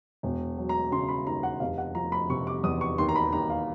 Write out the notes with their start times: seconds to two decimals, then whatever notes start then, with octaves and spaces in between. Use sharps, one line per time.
0.23 E1
0.57 F#3
0.69 A#5
0.92 C#3 C6
1.09 B5
1.27 D#2 A#5
1.43 F#5
1.60 F1 F5
1.78 F#5
1.95 F3 A#5
2.12 B5
2.29 C3 C#6
2.47 D6
2.63 E2 D#6
2.81 C#6
2.98 D#2 C6
3.09 A#5
3.16 B5
3.33 D#2 A#5
3.50 F5